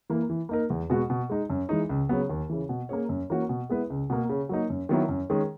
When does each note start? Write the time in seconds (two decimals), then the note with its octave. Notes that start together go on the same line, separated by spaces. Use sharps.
0.10 E3 A#3
0.30 E3
0.49 A#3 D#4 A#4
0.70 E2
0.90 B2 G#3 B3 F#4
1.10 B2
1.29 G#3 D#4
1.50 F#2
1.69 E3 G#3 D#4
1.89 C#2
2.09 C#3 F#3 B3
2.30 D#2
2.49 C#3 E3
2.69 B2
2.89 A#3 C#4 G#4 C#5
3.09 F#2
3.30 E3 A#3 C#4 F#4
3.49 B2
3.69 G#3 B3 E4 B4
3.90 C#2
4.10 B2 A#3
4.29 C#3
4.49 F#3 A#3 D#4
4.70 F#2
4.89 D#3 F#3 B3 E4
5.09 F#2
5.30 D#3 G#3 C#4 G#4